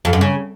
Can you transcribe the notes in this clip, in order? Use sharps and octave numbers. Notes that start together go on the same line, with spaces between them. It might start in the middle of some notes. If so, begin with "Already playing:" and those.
F2
F#2
C#3